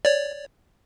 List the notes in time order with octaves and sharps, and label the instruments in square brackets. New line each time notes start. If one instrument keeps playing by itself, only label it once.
[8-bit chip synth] C#5 D5